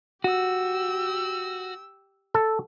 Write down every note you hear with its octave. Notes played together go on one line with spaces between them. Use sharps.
F#4 G4 E6
A4